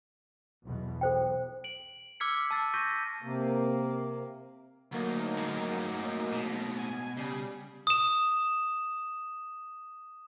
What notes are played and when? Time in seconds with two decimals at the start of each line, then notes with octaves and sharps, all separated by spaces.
0.63 B1 E2 B2
1.01 B1 A4 C5 G5
1.64 D7 F#7
2.20 D6 E6 F6 G#6 B6 C#7
2.51 A5 E6 A6 C7
2.74 C#6 G6 A#6 B6 D#7
3.22 C3 A#3
4.92 D2 F#3 A#3 D#4
5.39 A2 G#3 F#4 A#4
6.34 B2
6.77 G#5
7.17 C#3 G3
7.87 D#6 E7